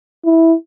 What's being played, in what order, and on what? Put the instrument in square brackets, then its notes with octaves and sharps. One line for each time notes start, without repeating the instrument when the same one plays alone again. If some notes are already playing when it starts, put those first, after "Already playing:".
[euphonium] E4